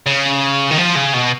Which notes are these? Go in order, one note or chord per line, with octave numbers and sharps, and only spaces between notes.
C#3
D#3
F3
C#3
B2